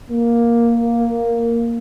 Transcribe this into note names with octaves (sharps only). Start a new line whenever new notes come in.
A#3